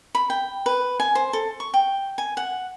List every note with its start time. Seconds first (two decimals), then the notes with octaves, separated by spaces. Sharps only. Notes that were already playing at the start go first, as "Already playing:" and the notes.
0.15 B5
0.30 G5
0.66 B4
1.00 G#5
1.15 C5
1.33 A4
1.60 C#6
1.74 G5
2.18 G#5
2.37 F#5